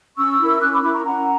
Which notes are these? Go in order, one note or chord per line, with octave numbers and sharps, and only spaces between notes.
C#4 C#6 E6
E4 A#4
C#4 D6 F#6
B5 D6
E4 A#4 B5 D6
A#5 C#6
C#4 F#5 A#5